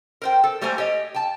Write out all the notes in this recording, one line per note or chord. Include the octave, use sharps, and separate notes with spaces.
A#4 C5 G5
A4
G3 A3 A#3 C5 G#5 A#5
G4 C#5 D#5
G5 A5